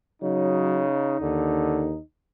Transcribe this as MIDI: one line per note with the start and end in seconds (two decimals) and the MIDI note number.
0.23 1.20 49
0.23 0.87 54
0.23 2.01 63
1.21 1.97 39
1.21 1.91 50